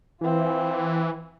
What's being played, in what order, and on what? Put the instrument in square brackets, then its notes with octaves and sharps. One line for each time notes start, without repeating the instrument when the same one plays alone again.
[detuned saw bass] E3 [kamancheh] C4 F4